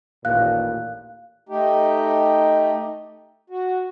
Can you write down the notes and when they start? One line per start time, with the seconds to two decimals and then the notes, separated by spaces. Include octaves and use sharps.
0.25 A1 D#2 A#2 F5 F#6
1.49 A3 D#4 G4
3.50 F#4